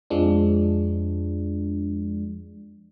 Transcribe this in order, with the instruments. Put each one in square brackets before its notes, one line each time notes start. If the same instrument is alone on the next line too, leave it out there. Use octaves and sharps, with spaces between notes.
[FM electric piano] F2 F3 G#3 D4